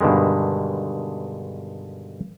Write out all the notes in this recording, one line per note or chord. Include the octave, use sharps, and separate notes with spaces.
G2 B2 D3 D#3 G#3